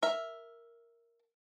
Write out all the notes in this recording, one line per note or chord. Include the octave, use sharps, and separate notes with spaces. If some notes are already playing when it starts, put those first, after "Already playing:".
A#4 E5